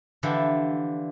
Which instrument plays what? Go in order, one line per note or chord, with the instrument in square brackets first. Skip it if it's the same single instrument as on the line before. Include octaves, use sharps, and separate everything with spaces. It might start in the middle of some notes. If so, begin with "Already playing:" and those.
[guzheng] D3 E3 F3 G4 A4